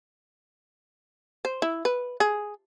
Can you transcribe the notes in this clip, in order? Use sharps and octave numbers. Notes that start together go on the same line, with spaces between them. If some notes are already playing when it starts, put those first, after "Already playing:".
C5
E4
B4
G#4